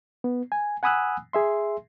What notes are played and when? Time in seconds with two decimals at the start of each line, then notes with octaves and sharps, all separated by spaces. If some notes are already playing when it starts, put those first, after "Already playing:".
0.24 B3
0.52 G#5
0.83 F#5 G#5 B5 D#6 E6 F#6
1.33 G#4 E5 C6